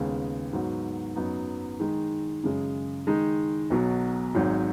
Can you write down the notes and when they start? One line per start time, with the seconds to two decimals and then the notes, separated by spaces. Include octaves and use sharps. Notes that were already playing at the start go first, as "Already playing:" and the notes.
Already playing: D#2 C#3 G#3 B3
0.53 G#2 F#3 B3 F#4
1.16 F#2 F#3 B3 D#4
1.79 D#3 G#3 D#4
2.43 F#2 C#3 G#3
3.07 D#3 G#3 D#4
3.70 B1 B2 F#3
4.35 G#1 G#2 F#3